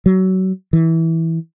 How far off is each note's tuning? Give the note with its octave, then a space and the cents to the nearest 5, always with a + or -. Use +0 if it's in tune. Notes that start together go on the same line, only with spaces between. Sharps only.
F#3 +25
E3 -15